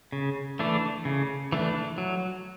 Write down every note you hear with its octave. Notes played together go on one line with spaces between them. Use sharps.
C#3
E3 A3 D4
C#3
E3 A3 D4
F#3